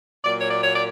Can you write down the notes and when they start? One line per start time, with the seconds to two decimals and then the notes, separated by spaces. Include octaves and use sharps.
0.25 A#2 F#3 A#3 D5
0.38 C#5
0.50 D5
0.63 C#5
0.73 D5